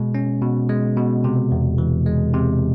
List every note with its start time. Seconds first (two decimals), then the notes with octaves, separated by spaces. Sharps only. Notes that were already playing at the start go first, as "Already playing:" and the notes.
Already playing: B2 G#3
0.14 C#4
0.42 B2
0.69 G#3
0.97 B2
1.24 C3
1.51 E2
1.78 E3
2.06 G#3
2.33 C3